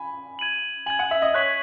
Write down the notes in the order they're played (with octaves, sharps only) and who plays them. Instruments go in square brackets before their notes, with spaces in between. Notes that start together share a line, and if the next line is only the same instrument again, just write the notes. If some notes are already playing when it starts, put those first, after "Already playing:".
Already playing: [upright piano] G#5 B5
[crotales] G#6 D#7 F#7
[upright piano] G#5 [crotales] G#6 D#7 F#7
[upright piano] F#5
E5
D#5
[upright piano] C#5 [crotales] F#6 B6 F#7